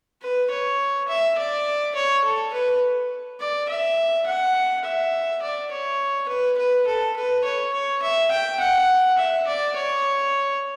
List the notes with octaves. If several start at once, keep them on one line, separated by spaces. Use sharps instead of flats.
B4
C#5
E5
D5
C#5
A4
B4
D5
E5
F#5
E5
D5
C#5
B4
B4
A4
B4
C#5
C#5
E5
G5
F#5
E5
D5
C#5